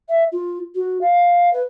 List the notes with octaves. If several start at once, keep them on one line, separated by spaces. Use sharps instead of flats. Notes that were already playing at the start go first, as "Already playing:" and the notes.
E5
F4
F#4
F5
B4